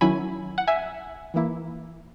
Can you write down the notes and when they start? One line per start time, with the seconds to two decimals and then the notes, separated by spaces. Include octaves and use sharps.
0.01 D#3 F#3 C#4 E4 G#5 B5
0.58 F#5
0.67 E5 G#5
1.34 E3 A#3 E4